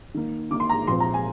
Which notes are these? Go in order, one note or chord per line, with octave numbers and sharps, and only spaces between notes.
D#3 A#3
D#3 A#3 D6
C6
A#5
A#2 F3 C4 C6
A#5
G#5